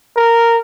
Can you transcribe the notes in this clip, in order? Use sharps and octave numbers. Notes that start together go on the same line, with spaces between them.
A#4